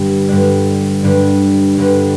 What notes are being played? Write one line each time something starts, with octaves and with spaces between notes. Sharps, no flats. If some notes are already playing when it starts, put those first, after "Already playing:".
Already playing: G2 D3 G3 D4
G2 D3 G3 D4
G2 D3 G3 D4
G2 D3 G3 D4